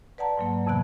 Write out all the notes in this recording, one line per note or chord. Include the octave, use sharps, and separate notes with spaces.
B4 D5 F#5 A5 A#5
G#2 F#3 A#3
F2 C3 E3 B3 F#6